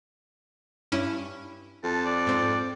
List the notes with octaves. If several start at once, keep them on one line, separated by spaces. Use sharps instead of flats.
G2 C#4 E4
F2 A5
D5
G#2 C4